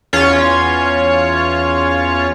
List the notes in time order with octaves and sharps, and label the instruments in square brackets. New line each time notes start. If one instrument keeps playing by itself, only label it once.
[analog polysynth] E2 C#4 F4 C#5